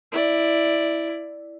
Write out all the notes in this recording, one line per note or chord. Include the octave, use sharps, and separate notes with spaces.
E4 D5